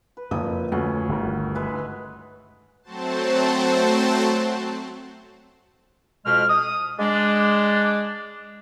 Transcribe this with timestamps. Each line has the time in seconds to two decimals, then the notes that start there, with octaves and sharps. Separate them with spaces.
0.17 B4
0.31 F#1 F2 D#6
0.72 D2 C#4
1.09 G1 D#3
1.55 G#3 B4 E5
2.83 F#3 A3 C4 F#4 C5 A5
6.24 F2 B2 G#3 F6
6.49 D#6
6.98 G#3 D4